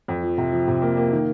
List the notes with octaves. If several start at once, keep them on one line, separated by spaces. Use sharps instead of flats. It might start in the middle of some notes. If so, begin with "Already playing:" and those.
F2
F3
C3
F3
C3
A#3
A#3
D#3